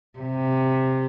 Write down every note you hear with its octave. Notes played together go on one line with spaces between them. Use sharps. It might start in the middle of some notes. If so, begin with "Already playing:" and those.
C3